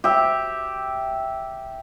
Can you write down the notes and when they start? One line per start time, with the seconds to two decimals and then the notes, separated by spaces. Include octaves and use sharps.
0.04 G4 E5